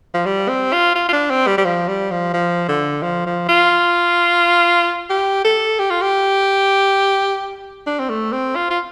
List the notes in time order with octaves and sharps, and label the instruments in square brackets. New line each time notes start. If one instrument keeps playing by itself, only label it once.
[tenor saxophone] F3
G3
C4
F4
F4
F4
D4
C4
G3
G3
F3
G3
F3
F3
D3
F3
F3
F4
G4
A4
G4
F4
G4
D4
C4
A3
C4
F4
F4